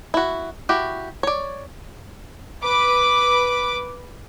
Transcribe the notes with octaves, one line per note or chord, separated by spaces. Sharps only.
E4 F#4
E4 F#4 G4
C#5 D5
B4 D6